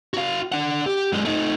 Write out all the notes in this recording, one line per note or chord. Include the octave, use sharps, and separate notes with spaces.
F#4 F5
D4 F#5
G4
F#2 G#3
A3 D#4